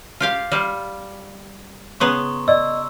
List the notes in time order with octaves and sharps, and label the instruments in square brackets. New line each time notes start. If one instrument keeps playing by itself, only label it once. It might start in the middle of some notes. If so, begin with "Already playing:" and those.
[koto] F4 G4 F5
G3 F4
[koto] C#3 B3 G#4 [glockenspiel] A#5 C6 C#6
[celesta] D5 D#5 [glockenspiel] E6